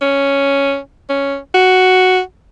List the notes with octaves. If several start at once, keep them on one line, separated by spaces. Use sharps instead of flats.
C#4
C#4
F#4